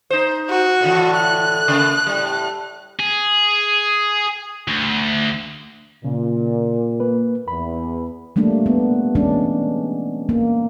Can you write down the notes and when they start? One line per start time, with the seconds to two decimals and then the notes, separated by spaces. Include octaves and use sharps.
0.10 D#4 C5
0.49 F#4
0.81 A2 D3 E3
1.16 F#6
1.68 C#3 A#3
2.07 A2 G3
3.00 G#4
4.68 D2
6.04 A#2 C#3
7.00 A#3 B4
7.48 E2 B5
8.36 G3 A3 A#3 D4
8.66 B3
9.15 E3 G#3 B3 C#4 D4
10.29 A#3